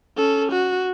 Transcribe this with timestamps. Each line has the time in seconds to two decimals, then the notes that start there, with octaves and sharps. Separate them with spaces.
0.17 C#4 A4
0.52 F#4